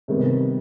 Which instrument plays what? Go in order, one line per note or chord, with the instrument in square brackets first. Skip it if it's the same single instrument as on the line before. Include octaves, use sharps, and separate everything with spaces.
[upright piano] C3 D#3 G3 B3